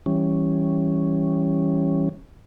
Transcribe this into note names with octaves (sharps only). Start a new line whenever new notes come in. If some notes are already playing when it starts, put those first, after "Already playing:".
E3 G3 C#4